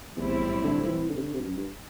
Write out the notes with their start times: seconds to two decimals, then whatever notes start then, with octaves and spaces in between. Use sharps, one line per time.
0.16 B1 E2 A2 G3 C4 E4
0.64 D3
0.87 E3
1.10 D3
1.17 C3
1.22 D3
1.34 C3
1.40 G2
1.45 F#2
1.57 G2